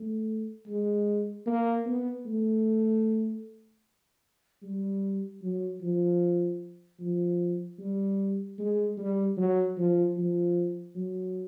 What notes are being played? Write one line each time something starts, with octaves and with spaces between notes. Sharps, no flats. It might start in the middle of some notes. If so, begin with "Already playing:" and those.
Already playing: A3
G#3
A#3
B3
A3
G3
F#3
F3
F3
G3
G#3
G3
F#3
F3
F3
F#3